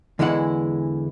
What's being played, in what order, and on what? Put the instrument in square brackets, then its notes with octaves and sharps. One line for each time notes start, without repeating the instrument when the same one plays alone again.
[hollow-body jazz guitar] E2 D3 E3 G#3 E4 F#5